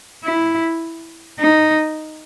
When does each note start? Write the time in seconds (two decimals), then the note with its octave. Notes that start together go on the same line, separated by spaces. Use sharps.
0.24 E4
1.39 D#4